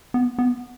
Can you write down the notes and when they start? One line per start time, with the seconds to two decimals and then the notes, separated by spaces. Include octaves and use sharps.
0.14 B3
0.39 B3